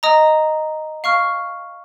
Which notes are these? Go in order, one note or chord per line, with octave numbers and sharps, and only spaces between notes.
D#5 A#5 D#6
F5 C#6 F6